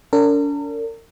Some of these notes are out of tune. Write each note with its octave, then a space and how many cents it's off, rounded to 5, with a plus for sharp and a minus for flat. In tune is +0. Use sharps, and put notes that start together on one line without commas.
D4 -45 A#4 -40